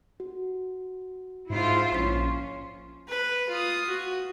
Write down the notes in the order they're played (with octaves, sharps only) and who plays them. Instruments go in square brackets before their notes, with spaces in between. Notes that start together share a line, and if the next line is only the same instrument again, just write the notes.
[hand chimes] F#4
[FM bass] G#2 [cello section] E4 F4 C5
[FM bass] A#1 [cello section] C#4 [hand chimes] C6 B6
[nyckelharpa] B4
F4 D#6
F#4